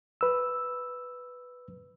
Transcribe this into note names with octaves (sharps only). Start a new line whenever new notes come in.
B4 E6